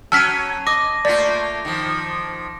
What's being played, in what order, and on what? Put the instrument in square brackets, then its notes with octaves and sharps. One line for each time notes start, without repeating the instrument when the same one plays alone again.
[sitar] F#3 C#4 [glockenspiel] A5 D#7 [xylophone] E6 F6 B6
[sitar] D#5 [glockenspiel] D6 [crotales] A#6
[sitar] A3 A#3 F4 [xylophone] D5
[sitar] D#3 F3